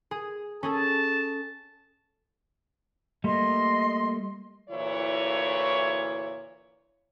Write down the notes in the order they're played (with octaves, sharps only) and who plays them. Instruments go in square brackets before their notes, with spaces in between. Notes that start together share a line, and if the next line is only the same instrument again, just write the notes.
[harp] G#4
[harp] C#4 G#4 A4 [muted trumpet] A5
[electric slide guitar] G3 A3 A#3 [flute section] D#5 C6
[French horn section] D2 A#2 E3 E4 C#5